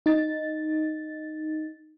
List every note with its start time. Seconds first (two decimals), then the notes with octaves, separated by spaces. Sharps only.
0.06 D#4 A6